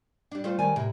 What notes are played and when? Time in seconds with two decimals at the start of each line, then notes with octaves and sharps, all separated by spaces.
0.32 G3 D4
0.44 G3 A3 F4 C5
0.59 D#3 C#5 D5 G#5
0.76 A2 C3 A#4